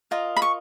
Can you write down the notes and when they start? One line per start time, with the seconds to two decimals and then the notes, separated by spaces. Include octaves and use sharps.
0.11 F4 A#4 D#5
0.37 B5
0.42 C#6